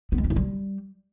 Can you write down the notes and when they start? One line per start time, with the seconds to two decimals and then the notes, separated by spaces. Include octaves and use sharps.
0.12 B3
0.18 G#3
0.24 C4
0.30 E4
0.36 G3